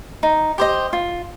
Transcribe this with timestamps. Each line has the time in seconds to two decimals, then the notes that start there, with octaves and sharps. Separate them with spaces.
0.23 D#4
0.58 G4 C5 D#5
0.93 F4